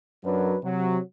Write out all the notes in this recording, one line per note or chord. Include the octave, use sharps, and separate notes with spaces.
F#2 F#3 D4 A#4 B4
C3 F#3